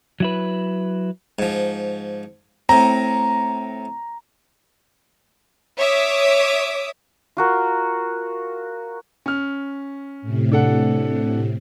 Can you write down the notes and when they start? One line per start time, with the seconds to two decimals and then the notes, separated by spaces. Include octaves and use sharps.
0.20 F#3 E4 B4
1.39 G#2 F3
2.69 A2 C4 A#5
5.78 C#5 E5 D6 D#6
7.37 F4 F#4 A#4
9.26 C#4 F6
10.22 A2 C3
10.52 D4 A4 F#5